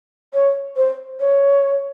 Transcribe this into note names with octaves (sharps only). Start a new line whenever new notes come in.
C#5
C5
C#5